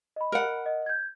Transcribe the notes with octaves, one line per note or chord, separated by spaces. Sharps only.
D#5 B5
A#4 F#5
D#5
G6 G#6